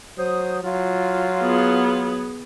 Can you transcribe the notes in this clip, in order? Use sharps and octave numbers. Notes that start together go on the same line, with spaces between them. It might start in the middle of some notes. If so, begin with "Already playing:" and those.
F#3 C5 D#6
F#3 F4
B3 G#4